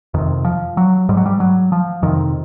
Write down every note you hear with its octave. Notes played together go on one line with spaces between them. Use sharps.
F2 C3 D#3
F3
F#3
G#2 G3
F#3
G3
F#3
F3
F2 C3 D#3